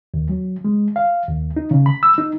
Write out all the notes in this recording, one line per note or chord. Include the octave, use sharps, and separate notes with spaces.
D#2
F#3
G#3
F5
D#2
D#4
C#3
B5
E6
D#4